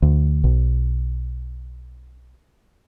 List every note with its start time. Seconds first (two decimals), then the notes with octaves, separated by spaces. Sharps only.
0.02 D2
0.44 B1